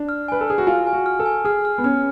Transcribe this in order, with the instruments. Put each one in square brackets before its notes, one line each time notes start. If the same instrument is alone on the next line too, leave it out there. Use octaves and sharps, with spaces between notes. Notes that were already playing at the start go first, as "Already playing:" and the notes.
Already playing: [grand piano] D4
[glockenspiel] F6
[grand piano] B4 [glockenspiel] G#5
[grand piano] A4
[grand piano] G#4 [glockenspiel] F6
[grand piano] F#4
[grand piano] F4 [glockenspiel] G#5
[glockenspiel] G#5
[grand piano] F#4
[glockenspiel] F6
[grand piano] A4
[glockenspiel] G#5
[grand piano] G#4 [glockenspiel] F6
[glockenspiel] F6
[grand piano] B3
[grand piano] C#4 [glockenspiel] F6